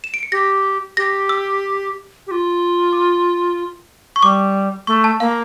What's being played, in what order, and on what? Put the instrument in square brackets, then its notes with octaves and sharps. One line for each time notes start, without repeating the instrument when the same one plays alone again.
[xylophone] E7
D7
C#7
[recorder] G4 [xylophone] A#6
[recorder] G4 [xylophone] A#6
[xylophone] E6
[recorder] G4
F4
[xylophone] D6
C#6
[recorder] G3 [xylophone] D6
[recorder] A3 [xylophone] C#6
[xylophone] A5
[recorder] A#3 [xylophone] F5